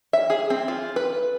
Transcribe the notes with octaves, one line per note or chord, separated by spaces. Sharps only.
E5
G#4
C4
F4
B4